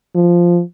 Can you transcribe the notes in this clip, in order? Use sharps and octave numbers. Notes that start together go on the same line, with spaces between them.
F3